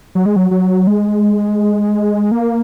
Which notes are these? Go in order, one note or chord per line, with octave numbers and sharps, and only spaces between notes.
F#3
G#3
F#3
F#3
G#3
A#3